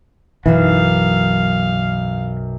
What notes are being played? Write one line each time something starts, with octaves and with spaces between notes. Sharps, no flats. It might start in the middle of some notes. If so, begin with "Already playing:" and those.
B1 F#2 E3 F5